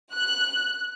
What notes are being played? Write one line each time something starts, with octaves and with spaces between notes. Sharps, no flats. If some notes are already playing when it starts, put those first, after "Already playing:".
F#6